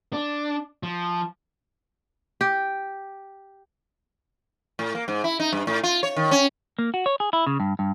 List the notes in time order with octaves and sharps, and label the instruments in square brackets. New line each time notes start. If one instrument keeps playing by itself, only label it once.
[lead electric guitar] D4
F3
[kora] G4
[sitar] A2
A#3
G#2
E4
D#4
G2
A2
F4
C#5
D#3
C#4
[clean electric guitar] A#3
F#4
C#5
G#4
E4
C#3
G2
G2